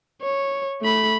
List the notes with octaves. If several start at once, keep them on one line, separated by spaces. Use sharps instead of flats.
C#5
A3 B5